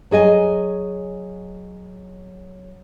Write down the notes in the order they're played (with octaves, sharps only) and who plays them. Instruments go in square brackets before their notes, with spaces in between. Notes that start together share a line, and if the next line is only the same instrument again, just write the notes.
[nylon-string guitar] F#3 G#4 D#5 G#5